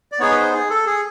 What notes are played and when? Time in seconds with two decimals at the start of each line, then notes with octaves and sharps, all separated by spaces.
0.12 D5
0.19 B3 D#4 G#4 C#5
0.31 B4
0.37 C5
0.53 G#4
0.70 A4
0.86 G#4